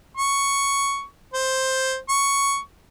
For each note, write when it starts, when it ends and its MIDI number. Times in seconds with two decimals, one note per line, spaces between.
0.17 1.04 85
1.33 1.97 72
2.09 2.59 85